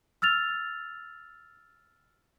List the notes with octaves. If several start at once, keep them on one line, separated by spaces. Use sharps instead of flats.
E6 F6 A6 F7